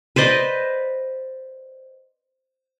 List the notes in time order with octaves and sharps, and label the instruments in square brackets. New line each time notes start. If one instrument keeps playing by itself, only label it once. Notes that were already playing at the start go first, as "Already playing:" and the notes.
[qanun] B4 C5 D5 D#5